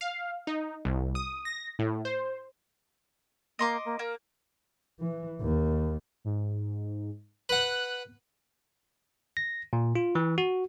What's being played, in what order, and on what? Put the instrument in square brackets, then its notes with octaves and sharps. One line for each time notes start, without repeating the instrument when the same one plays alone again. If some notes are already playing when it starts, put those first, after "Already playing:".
[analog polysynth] F5
D#4
C2
D#6
A#6
A2
C5
[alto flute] A#3 [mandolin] D#5 C6 D6
[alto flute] A#3
[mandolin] A#3 [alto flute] A#4
[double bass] E3
D#2
[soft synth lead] G#2
[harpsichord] B4 F#5 [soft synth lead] F#6
[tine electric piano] A#6
A#2
F4
E3
F#4